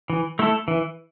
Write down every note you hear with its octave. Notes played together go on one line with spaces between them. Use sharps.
E3
A3 E4 A4
E3